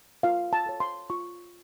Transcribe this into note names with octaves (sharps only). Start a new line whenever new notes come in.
F4 F5
A5
A4 C#5
C6
F4 C#6